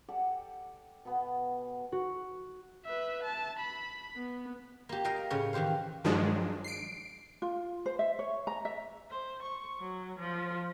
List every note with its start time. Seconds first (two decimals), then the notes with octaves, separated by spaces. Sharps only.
0.08 G4 A4 D5 F#5
1.05 B2 B3
1.92 F#4
2.85 B4 E5
3.23 A5
3.59 B5
4.16 B3
4.89 A#3 G4
5.04 A#4 D#5 F5 G5
5.30 A2 C#3 C#4
5.53 D#3 E3 G4 C5 F5
6.04 G2 D#3 F3 F#3 G#3 D4
6.64 C7 D7
7.42 F4
7.86 C5
7.99 E5
8.19 C#5
8.47 A#5
8.65 E5
9.10 C5
9.42 C#6
9.79 F#3
10.19 F3